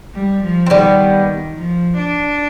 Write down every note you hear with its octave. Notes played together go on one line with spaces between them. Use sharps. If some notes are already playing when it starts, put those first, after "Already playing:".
G3
F3
C4
D#3 G3 B3
F3
D4